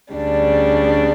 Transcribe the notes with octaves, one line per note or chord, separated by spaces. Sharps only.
D2 C#3 G3 D4